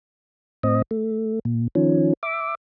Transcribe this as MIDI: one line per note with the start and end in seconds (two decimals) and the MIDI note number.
0.63 0.82 45
0.63 0.82 60
0.63 0.82 75
0.91 1.39 57
1.45 1.68 46
1.75 2.13 51
1.75 2.13 53
1.75 2.13 61
2.23 2.55 76
2.23 2.55 86